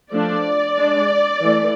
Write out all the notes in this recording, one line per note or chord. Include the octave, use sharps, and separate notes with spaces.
F3 A3 D4 D5
G#3 D4
E3 A3